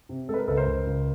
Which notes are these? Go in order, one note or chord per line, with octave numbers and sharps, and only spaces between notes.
C3
G#3 A4
B4
A#4
C#2 A4 B4
A#4 C5
C#2
C#2